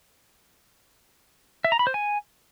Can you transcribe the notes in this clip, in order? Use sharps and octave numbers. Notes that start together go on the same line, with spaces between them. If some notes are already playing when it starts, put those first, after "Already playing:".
E5
A#5
B5
C5
G#5